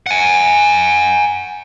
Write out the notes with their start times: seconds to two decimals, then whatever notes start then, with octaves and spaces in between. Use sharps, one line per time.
0.07 F#5 G#5